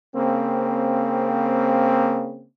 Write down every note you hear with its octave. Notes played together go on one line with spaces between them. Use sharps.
C#3 A#3 C4